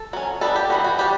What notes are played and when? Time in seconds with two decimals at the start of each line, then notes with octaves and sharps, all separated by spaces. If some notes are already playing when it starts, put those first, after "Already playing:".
Already playing: A4
0.13 F#3 C#4
0.41 G3 B3 D4 A4
0.56 G4
0.70 E3 G3 B3 F#4
0.84 F#4
0.98 G3 D4 G4